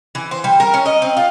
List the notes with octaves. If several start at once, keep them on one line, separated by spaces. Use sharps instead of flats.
E3
C5
G3
A#4
C#4
D#5
C4
F4